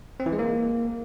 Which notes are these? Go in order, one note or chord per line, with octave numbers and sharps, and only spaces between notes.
C4
E3
G#3
A#3